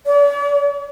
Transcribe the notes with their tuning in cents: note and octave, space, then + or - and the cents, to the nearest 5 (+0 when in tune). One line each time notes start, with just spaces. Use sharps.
D5 -45